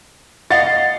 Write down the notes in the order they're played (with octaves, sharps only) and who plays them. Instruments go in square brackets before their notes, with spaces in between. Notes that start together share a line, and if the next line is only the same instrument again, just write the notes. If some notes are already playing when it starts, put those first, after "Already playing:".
[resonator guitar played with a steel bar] D#5 F5 F#5 [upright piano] A6